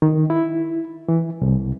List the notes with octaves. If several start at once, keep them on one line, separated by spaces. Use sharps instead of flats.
D#3
E4
E3
C2